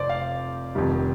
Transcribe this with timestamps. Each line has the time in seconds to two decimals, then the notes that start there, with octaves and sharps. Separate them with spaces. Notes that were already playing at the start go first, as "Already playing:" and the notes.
Already playing: F1 F2 C5 D5
0.09 F5
0.75 F1 F2 D#3 G3